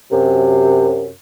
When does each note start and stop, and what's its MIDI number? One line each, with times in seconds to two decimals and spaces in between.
0.11 1.10 42
0.11 1.10 48